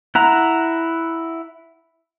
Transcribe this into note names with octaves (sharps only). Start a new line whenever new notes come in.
E4 F#5 A#5